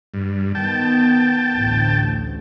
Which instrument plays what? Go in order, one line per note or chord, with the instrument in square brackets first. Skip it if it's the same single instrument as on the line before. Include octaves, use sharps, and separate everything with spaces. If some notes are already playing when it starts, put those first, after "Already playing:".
[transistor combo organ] G2
[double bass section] D#3 B3 [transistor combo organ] G5 A5
[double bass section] A1 D2